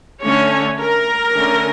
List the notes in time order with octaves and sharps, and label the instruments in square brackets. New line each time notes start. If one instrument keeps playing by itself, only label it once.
[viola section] D3 A3 C#4 C#5
A#4
D3 A3 C#4